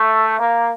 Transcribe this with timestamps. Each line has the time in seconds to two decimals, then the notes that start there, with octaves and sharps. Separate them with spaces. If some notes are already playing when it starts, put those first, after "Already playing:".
Already playing: A3
0.39 A#3